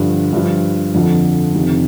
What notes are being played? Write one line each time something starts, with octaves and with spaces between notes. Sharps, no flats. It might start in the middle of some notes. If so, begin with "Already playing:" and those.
Already playing: G2 D3 F3
G2 F3
F2 D3 F3
F2 C3 D#3